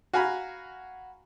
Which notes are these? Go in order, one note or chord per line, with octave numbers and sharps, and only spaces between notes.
F#4 F5 G#5 A#5 B5